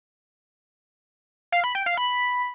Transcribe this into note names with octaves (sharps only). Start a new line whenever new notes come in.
F5
B5
G5
F5
B5